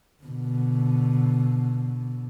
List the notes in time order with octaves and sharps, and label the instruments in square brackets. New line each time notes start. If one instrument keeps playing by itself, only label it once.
[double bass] B2 D3